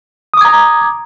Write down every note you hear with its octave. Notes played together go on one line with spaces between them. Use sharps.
A#5 D6 D#6 G#6